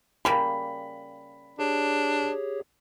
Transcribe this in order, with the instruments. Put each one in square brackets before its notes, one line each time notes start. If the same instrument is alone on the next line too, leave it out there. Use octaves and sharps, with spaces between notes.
[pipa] C#3 G3 A#3 [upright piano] B5
[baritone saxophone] D4 [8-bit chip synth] G4 G#4 C#5